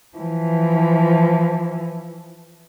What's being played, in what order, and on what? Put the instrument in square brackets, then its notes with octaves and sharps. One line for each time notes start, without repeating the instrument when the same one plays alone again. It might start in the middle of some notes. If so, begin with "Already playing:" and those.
[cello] E3 F3